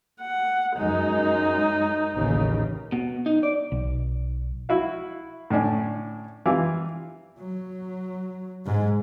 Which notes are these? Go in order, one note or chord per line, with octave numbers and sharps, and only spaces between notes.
F#5
F#2 G#3 D#4
A1 D#2 C#3
B2
D#4
D5
B1
E4 F#4 F5
A2 D3 C#4 D4
E3 G3 F4 F5 D6
F#3
G#2 G#3